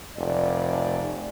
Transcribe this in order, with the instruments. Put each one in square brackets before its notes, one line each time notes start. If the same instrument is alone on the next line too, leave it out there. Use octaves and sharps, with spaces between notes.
[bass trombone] F1 [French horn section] D5